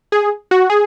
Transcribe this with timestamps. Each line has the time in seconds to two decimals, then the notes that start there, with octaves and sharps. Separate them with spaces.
0.12 G#4
0.51 F#4
0.70 G#4